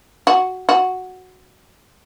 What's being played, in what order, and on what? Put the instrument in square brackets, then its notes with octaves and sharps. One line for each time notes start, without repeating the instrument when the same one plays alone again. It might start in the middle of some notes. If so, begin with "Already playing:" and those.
[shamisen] F#4
F#4